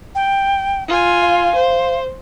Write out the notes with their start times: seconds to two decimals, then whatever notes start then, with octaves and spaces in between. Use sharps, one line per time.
0.15 G5
0.88 F4 G#5
1.22 F5
1.56 C5